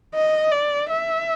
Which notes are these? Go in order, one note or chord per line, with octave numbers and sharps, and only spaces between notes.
D#5
D5
E5